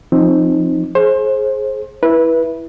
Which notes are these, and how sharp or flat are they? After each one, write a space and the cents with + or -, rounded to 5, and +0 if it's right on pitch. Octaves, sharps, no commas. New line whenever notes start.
F3 +0 C4 +15 D#4 +0
G#4 +30 C5 +30
E4 +0 B4 -20